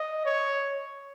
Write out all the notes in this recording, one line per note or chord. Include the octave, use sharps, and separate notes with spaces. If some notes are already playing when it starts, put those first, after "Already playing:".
Already playing: D#5
C#5